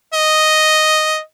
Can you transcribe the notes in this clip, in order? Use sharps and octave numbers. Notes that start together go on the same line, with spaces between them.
D#5